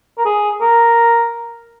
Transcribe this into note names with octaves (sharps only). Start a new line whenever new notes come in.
A#4
G#4
A#4